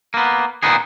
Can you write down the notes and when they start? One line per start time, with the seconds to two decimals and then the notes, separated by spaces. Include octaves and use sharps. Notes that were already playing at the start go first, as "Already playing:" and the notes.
0.14 A#3 B3
0.63 A#2 D#3 B3 D#4 G#4